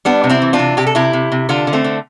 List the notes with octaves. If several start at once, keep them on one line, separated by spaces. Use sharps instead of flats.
G3 B3 D4
C3
C4 E4
E3
D4 F4
C3
C3 G4
A4
C3 E4 G4
C3
C3
D3 D4 F4
D3
A3 C4
D3